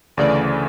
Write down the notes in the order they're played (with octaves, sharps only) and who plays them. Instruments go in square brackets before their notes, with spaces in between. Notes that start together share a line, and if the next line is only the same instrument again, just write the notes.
[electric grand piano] D2 C#3 E3 A3 [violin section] D5